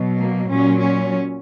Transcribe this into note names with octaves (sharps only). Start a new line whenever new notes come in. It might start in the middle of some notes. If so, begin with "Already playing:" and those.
Already playing: B2 F#3
A#3
A#2 F#3 C#4
C#4